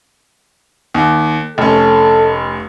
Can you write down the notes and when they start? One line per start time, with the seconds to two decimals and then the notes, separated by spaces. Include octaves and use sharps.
0.94 D#2
1.58 F1 C#4 A4